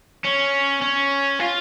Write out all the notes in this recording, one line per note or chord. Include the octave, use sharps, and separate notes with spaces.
C#4
C#4
F4